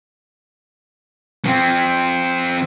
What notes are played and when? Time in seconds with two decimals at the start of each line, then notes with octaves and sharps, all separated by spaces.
1.45 F3 C4